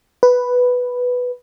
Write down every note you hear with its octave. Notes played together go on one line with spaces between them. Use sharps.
B4